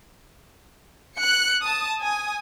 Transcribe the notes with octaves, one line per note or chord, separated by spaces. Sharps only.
F#6 C#7
A5 D#6
G#5 D#6